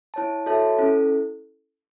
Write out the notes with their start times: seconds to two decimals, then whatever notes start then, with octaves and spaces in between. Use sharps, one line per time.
0.14 E4 C#5 A5
0.46 F#4 A4 C#5 E5 A5
0.78 C#4 E4 A4